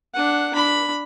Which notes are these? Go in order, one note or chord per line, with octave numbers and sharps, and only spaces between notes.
D4 F#5
D4 B5